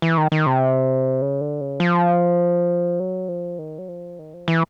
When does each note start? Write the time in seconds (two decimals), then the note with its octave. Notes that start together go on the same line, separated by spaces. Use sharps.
0.02 E3
0.17 D#3
0.32 D#3
0.46 C3
1.21 C#3
1.41 D3
1.61 C#3
1.80 F3
3.00 F#3
3.28 F3
3.59 D#3
3.78 F#3
3.88 F3
4.19 D#3
4.34 F3
4.48 E3